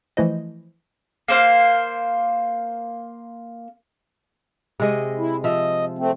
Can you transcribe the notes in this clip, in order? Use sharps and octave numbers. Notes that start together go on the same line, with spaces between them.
E3 F3 A3 E4 C5 D#5
A#3 C5 F5
C3 G#3 D#5
E4
F3 D#5 E5
A3 C4